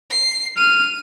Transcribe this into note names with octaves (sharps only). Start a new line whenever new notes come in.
C7
F6 D#7